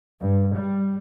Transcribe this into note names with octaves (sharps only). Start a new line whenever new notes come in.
G2
G3